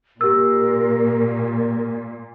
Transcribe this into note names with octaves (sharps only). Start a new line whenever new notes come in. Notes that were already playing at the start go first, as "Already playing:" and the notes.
A#2 G4 A#4 E6